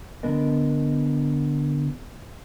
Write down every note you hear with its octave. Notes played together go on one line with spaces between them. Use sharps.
D3 B3 D4 A#4 D#5